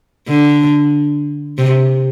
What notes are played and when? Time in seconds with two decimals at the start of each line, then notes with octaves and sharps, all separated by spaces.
0.28 D3
1.58 C3